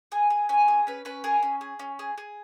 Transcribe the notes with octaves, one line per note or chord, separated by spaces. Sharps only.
G#4 G#5
G#4
C#4 G#5
G#4
C#4 B4
C#4 B4
G#4 A#4
C#4
G#4
C#4
G#4
G#4